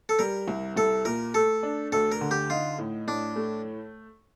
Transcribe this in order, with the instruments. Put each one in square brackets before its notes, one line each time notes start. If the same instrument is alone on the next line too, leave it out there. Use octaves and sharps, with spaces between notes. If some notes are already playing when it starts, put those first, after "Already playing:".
[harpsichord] A4
[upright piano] G3 [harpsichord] A#4
[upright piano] C2
[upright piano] C2 [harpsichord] A4
[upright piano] A#2 [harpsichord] A#4
[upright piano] A3 [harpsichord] A4
[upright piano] D4
[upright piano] D2 [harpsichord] A4
[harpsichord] A#4
[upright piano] D3
[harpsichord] G4
[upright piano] D#4 [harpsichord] F4
[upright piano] A2
[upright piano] A2 [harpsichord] D4
[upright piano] A3